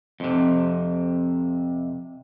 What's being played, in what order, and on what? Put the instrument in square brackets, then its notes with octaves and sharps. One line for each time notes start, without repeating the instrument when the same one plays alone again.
[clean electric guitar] F2 C3